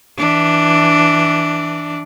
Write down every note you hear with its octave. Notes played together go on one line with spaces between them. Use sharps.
E3 D4